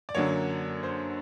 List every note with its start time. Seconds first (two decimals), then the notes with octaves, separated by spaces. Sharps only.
0.09 D5
0.15 F#2 D3 F#3 A#3 C#5
0.83 C5